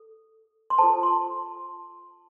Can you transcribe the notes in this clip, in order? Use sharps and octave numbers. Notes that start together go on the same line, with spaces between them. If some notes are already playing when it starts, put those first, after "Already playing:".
Already playing: A4
C6
F4 A4 C5 A5
C6